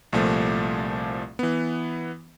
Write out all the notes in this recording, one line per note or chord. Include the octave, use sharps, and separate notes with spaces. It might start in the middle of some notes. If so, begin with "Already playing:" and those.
C2 A#2 F3 A3
E3 B3